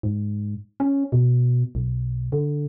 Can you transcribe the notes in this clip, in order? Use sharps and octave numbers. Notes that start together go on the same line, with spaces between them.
G#2
C#4
B2
B1
D3